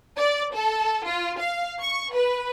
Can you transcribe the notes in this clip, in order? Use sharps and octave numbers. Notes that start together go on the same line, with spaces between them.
D5
A4
F4
F5
C#6
B4